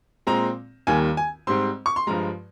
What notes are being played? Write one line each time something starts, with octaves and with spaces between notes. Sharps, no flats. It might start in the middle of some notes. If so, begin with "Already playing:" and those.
A#2 G#3 C4 A#5
D#2 D#3 G3 A#3 G#5
G#5
G#2 G3 C4 C6
C#6
C6
G2 F3 G#3 A#5